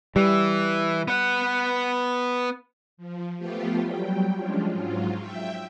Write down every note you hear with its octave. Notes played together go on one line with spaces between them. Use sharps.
E3 G3
B3 F#5
F3
F3 A3 B3 F4 G4
F#3 G3 G5
F3 G#3 C#4 D4 F4
G#2 F#3 F4
E5 G5